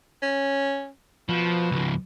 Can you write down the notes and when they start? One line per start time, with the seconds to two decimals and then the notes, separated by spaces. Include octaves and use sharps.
0.23 C#4
1.29 B2 F3
1.72 C#2 F3